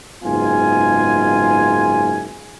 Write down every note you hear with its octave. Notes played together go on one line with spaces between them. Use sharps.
F#1 G#2 B3 F4 G#5